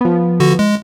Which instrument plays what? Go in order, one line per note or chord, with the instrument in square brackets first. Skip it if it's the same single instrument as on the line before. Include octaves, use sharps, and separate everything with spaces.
[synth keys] F3 B3
[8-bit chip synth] D3 F#4
G#3